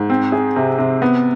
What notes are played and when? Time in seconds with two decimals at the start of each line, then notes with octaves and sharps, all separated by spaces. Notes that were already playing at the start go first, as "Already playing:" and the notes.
Already playing: G#2
0.10 C4
0.32 G#4
0.56 C3
0.79 C3
1.02 B3